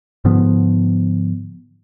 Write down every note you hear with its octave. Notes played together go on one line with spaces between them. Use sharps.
G#2 D3 F3 B3